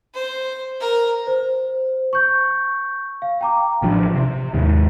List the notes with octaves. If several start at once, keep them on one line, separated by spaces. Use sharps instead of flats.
C5
A#4
C5
C#6 G6
F5
G5 A#5 D6
A1 E3 F3 D4
C3
D#2 G#2 D#3